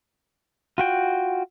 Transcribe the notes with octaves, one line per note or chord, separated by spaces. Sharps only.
F4 F#4 G5